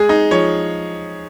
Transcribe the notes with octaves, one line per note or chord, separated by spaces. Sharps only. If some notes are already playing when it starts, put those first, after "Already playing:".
Already playing: G#3 G#4
D#4
F3 C#5